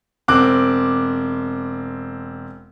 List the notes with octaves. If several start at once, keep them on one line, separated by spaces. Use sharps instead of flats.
E1 C4 D6 F#6